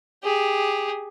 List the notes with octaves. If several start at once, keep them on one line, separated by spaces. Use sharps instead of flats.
G4 G#4